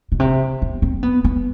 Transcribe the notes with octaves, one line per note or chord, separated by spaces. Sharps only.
B2
C3
B3
C4
B3
B3